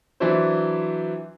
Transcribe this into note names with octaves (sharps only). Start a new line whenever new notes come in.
E3 F#3 D4 E4 C5